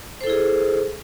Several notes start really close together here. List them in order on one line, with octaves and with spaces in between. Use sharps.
C5 A4 E4 G#4